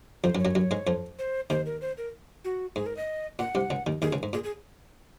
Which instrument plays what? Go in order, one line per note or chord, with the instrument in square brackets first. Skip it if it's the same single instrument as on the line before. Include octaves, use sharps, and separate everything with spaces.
[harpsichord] F2 F3 [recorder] C5
[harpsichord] F#2 F#3
[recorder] C#5
[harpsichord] F#2 F#3
F#2 F#3
G#2 G#3
F2 F3
[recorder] C5
[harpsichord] D#2 D#3 [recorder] C5
[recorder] A#4
C5
A#4
F#4
[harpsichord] G#2 [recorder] G#4
[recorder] A#4
D#5
[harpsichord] A#2 [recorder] F#5
[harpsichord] C2 C3
C#2 C#3
D#2 D#3
[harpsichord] D#2 D#3 [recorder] G#4
[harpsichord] C#2 C#3
G#2
[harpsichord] A#2 [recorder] G#4
[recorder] G#4